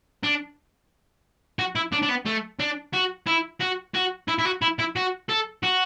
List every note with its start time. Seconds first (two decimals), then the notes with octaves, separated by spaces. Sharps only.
0.24 D4
1.59 F#4
1.76 E4
1.93 D4
2.03 D4
2.09 B3
2.26 A3
2.60 D4
2.94 F#4
3.27 E4
3.61 F#4
3.95 F#4
4.28 E4
4.39 E4
4.45 F#4
4.62 E4
4.79 E4
4.96 F#4
5.29 A4
5.63 F#4